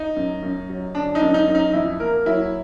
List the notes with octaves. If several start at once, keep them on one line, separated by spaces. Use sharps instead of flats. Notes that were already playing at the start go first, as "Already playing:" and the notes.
Already playing: D#4
F#2
F#2
F#3
D3 D4
D#4
F#2
D#4
F#2
D#4
F2 E4
A#3 A#4
F#3 E4